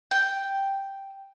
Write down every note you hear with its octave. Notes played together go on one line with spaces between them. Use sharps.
G5